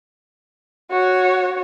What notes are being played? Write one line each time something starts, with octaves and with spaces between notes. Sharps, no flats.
F#4 C#5